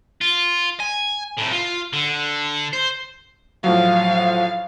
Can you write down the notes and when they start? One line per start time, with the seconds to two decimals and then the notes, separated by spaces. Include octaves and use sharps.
0.21 F4
0.80 G#5
1.37 C2 A2
1.52 F4
1.93 D3
2.73 C5
3.64 A2 F3 F#3 F5